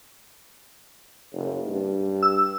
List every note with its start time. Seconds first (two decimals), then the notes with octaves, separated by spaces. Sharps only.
1.33 F#1
1.68 G2
2.22 E6